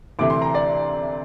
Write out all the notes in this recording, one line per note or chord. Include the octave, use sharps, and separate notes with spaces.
D2 C3 E3 A3 D6
C6
A#5
D5